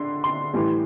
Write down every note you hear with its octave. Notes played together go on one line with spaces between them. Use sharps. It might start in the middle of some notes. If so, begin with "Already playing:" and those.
Already playing: D3 C6
C6
A2 E3 G3